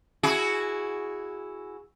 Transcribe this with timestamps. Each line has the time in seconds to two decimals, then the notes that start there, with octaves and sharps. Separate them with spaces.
0.23 E4 F#4 G#4